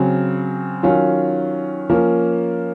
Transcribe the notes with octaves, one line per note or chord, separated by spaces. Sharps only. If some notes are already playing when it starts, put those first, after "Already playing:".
Already playing: C#3 F#3 C4
D#3 F#3 C#4 F4
F3 A#3 C#4